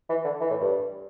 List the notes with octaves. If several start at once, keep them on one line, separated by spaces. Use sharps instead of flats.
E3
D3
E3
A2
G2